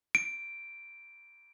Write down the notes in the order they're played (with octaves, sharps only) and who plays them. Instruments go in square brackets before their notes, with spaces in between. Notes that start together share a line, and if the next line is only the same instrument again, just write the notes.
[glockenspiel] D7